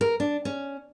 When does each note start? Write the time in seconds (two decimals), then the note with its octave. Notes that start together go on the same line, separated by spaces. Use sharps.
0.01 A#4
0.20 D4
0.45 C#4